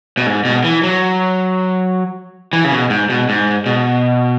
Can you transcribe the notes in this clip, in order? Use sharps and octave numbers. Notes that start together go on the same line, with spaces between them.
B2
G#2
B2
E3
F#3
E3
C#3
B2
G#2
B2
G#2
B2